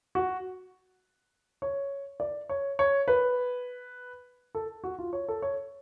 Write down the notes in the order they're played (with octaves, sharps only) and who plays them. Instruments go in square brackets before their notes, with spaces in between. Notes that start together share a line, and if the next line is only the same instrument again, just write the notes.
[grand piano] F#4
C#5
D5
C#5
C#5
B4
A4
F#4
F4
C#5
A4
C#5